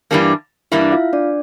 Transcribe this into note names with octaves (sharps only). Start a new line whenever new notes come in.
G2 E3 G3 A#3 D4
G2 E3 G3 A#3 D4 E4 E5
F4 F5
D4 D5